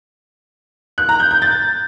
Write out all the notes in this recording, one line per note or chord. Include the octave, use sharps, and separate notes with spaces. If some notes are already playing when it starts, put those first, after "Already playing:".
F#6
A#5
G6
G6
A6